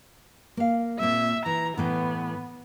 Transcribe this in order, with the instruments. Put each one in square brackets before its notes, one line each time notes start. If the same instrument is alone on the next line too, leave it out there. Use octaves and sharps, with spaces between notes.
[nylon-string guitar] A#3 F5
[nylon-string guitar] A#2 A#3 C4 [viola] E5
[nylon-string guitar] E3 [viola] A#5
[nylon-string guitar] A2 E3 G5 [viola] B3